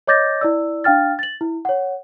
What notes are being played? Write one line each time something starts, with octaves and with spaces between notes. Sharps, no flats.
C#5 D#5 D6 G6 A6 A#6
E4 D5 E6
D4 F5 G5 F6 A6
A6 F#7
E4
C#5 F#5